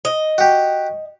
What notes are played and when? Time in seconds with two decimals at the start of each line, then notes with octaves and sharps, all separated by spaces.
0.05 D#5
0.38 F#4 G4